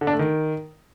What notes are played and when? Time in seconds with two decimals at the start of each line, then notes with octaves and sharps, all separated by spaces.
0.01 D3
0.07 D4
0.13 A3
0.19 D#3